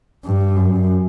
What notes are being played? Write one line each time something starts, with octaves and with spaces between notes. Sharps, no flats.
G2
F#2